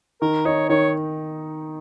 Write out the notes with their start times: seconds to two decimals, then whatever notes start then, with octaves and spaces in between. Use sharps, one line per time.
0.22 D#3 A#4
0.45 D#4 C#5
0.69 D#3 C#5